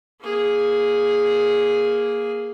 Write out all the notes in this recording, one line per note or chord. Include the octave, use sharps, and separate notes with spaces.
A#3 G#4